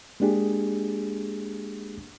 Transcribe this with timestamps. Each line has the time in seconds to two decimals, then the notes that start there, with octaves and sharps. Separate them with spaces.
0.20 G#3 A#3 D4 G4 G#4